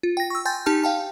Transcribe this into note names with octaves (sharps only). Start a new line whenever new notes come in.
F4
G5 A#6
C#6 E6
G5 G#5 C6 G6 A6
D#4 G4 A5 F6
F5 G5 A5